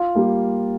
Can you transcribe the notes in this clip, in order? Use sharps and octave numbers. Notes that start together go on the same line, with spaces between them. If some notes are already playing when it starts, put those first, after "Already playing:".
Already playing: F4
G3 A#3